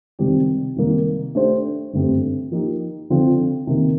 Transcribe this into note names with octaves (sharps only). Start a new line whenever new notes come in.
C3 D#3 G3 C4 G4
C3 D#3 G3 A#3
A3 D4 G4 C5
G2 D3 A3 C4 G4
F3 A#3 D#4 G4
D3 F3 C4 F4
C3 D#3 A#3